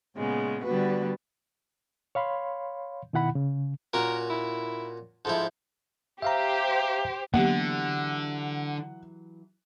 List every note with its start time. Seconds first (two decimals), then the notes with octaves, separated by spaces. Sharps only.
0.15 A#2 C#3 G#3 B3
0.64 D3 G3 B3 F#4 B4
2.15 C#5 F5 B5 C6
3.13 B2 D#3 E4 F#5 B5
3.35 C#3
3.94 A#2 C#4 F#4 A#4
4.30 E4
5.25 G#2 F3 E4 A4
6.22 G4 C5 E5 F5 A#5
7.34 D3 E3 F#3 A#3 B3 G4 F#5